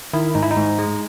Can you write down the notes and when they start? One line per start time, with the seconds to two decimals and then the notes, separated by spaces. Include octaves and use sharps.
0.14 D#3 E4
0.35 G#2 D#4
0.43 E4
0.51 D#4
0.56 G#2
0.79 G#3